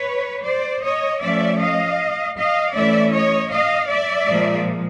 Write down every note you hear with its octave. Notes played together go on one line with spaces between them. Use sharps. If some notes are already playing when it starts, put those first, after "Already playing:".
Already playing: B4 C#5
C5 D5
C#5 D#5
F3 A3 C#4 D5 E5
D#5 F5
D#5 F5
E3 A3 C#4 D5 E5
C#5 D#5
D#5 F5
D5 E5
A#2 F3 G#3